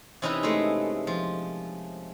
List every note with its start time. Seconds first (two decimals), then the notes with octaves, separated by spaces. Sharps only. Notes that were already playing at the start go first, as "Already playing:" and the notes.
0.22 C3 E3 C#4 D#4 E4 B4
0.43 G#3 A3
1.07 F3